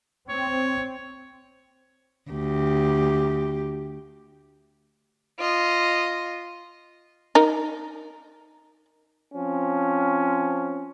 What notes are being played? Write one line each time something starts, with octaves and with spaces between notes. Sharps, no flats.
C4 C#5
D2 G4
F4 D#5
D#4 A#4
F3 C4 C#4